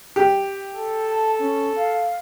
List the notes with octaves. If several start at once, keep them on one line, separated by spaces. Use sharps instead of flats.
G4
A4
A5
C#4
F5